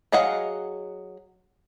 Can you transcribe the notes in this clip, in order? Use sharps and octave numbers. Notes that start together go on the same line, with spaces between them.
F#3 G#4 D#5 F5 F#5